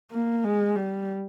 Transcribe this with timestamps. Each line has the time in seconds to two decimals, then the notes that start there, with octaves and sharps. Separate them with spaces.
0.12 A#3
0.44 G#3
0.75 G3